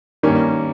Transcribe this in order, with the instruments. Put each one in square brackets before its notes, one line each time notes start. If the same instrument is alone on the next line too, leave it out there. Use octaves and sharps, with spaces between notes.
[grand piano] G2 D#3 G3 A#3 C#4